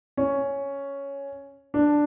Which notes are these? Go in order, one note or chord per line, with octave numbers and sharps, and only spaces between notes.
C#4
D4